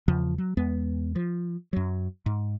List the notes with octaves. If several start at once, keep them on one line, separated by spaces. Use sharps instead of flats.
E2 C#3 F3
F#3
E2 G#3 B3
F3
F#2 F#3
G#2